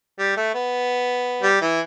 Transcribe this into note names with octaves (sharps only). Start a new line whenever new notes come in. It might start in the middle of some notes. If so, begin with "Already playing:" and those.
G3
A3
B3
G3
E3